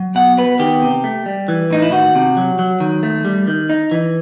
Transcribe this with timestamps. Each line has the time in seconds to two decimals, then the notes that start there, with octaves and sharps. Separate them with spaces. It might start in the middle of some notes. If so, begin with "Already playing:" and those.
Already playing: F#3
0.15 B2 F#5
0.38 B3 B4
0.59 D#3 G4
0.82 C3
1.04 A3
1.26 G3
1.48 E3
1.71 A2 D#4
1.82 E4
1.91 D#3 F#4
2.15 C3
2.37 F#3
2.59 F#3
2.80 D#3
3.03 A3
3.25 G3
3.48 D#3
3.69 D#4
3.91 E3